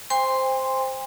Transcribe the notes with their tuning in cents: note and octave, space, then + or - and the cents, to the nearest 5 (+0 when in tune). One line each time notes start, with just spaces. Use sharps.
C5 +0 G5 +45 C6 +0